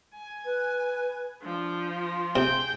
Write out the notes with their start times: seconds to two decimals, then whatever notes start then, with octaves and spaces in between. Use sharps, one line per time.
0.14 G#5
0.45 B4
1.43 F3 D4
1.99 C6
2.36 C3 G#4 G5